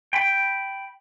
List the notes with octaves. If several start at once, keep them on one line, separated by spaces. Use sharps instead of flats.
G5 B5